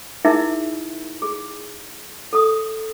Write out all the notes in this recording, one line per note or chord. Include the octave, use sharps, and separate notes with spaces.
D#4 E4 G#4 A#4 E5
G#4
A4 D#6